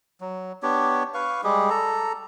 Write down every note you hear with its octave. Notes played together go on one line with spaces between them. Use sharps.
F#3
B3 D4 G4 C#5
B4 F5 C#6
G3 G#3 G4 G#4
A4 A#5